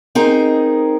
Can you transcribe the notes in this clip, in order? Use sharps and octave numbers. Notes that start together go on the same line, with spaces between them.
C4 D#4 G#4 A#4